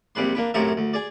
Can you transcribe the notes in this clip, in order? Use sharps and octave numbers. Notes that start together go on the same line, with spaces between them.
A#1 C3 G3 B4 C6
A#3 D4 B4
F#2 A2 C3 C4 A4 A#4
D2
G#4 D5